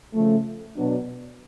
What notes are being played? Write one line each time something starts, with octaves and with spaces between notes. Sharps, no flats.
C#3 F3 A3
B2 F#3 B3 D4